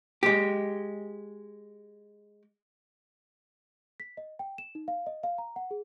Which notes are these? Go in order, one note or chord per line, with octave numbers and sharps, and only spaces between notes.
G#3 G4
B6
D#5
G5
E7
D#4
F5
D#5
F5
A#5
F#5
G#4